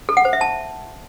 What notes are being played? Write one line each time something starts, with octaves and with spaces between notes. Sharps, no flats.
A4
F#5
C5
E5
A5